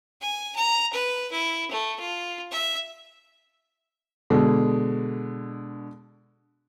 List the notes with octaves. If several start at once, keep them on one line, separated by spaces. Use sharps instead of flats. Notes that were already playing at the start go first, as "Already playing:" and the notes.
G#5
A#5
B4
E4
A3
F4
E5
B2 D3 G#3